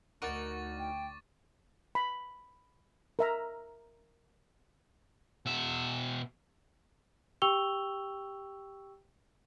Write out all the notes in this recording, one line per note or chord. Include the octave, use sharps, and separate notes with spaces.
D2 D#4 F#4 A#4 C#6 D6 A6
G5
B5
A#4 E5 A#5
B2 E5
G4 G5 C#6 E6 F7 G7